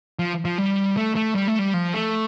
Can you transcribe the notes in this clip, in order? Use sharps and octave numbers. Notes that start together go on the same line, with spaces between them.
F3
F3
G3
A3
A3
G3
A3
G3
F3
A3